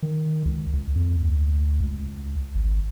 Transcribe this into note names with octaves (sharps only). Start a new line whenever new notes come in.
D#3
C#2
C#2
F2
D2
C#2
G#1